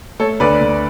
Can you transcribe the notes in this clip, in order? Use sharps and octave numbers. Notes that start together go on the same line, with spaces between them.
A3 A4 C#5
D2 B4 D5
D2